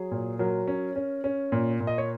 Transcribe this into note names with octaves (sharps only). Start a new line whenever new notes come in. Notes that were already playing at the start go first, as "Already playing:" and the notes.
Already playing: F#3 G#4
A#2
F#3 A#4
C#4
C#4
C#4
A#2
A#2
D#5
C#5